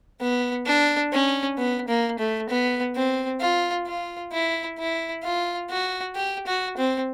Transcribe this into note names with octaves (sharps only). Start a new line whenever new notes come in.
B3
D4
C#4
B3
A#3
A3
B3
C4
F4
F4
E4
E4
F4
F#4
G4
F#4
C4